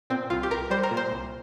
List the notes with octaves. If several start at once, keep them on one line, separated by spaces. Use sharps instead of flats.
A#2 C4
C2 F4
G4
C2 A#4
G3 C5
A#4
A#2
C5
C2